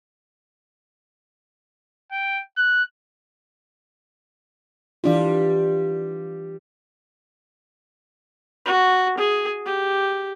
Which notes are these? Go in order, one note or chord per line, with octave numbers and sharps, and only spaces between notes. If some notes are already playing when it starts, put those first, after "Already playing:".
G5
F#6
E3 G3 D4 F4 G4
F#4
G#4
G4